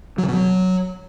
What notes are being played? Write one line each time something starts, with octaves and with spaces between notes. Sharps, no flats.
F#3
D3
B2
F#3